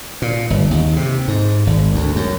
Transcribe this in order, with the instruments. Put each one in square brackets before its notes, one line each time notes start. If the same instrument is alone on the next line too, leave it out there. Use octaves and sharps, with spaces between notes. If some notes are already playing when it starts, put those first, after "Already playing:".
[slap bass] A#2
G1
D#2
C3
G#2
G#1
D2
F#2